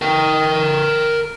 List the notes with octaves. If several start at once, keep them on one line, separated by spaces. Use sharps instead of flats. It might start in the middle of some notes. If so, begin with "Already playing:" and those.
A#4 G5